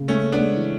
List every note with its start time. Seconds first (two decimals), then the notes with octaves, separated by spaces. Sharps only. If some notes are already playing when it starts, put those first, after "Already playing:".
Already playing: C#3
0.08 G#3 A3 C#4
0.24 G#3
0.32 B3 D4
0.40 G#3
0.56 E3